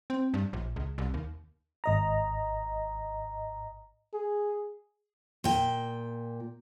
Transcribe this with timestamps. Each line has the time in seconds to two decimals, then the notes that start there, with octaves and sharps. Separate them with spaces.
0.10 C4
0.34 G2
0.53 A#1
0.76 C#2
0.98 C2
1.14 D#2
1.84 G#1 D#5 A#5
4.14 G#4
5.44 A#2 G5